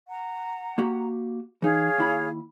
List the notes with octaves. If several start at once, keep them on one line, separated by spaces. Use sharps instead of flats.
F#5 A#5
A#3 F#4 G4
E3 D#4 G#4 C#5 F5
D#2 E4 B5